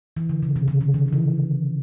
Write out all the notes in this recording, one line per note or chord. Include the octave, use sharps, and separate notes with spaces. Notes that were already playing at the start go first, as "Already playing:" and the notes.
E3
D3
C#3
C3
C#3
D3
D#3
F3
E3